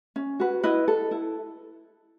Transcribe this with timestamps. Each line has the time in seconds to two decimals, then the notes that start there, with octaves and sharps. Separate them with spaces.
0.16 C#4
0.40 F#4 B4
0.64 E4 B4 D#5
0.88 A4
1.11 E4